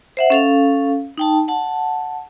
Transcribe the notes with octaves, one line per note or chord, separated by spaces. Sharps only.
C5 E5 F#5
C#4 A4 F5
D#4 G5 A5
F#5 A5